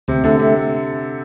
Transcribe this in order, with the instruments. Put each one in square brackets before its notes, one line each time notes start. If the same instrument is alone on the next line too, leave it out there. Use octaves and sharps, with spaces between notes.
[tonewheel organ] D2 [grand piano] C3
[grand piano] D3 [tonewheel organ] A3
[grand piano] C3 [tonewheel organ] A3